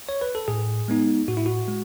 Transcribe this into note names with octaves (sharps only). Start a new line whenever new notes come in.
C#5
B4
A4
A2 G#4
G#3 B3 D#4
A2 F#4
E4
F#4
G#3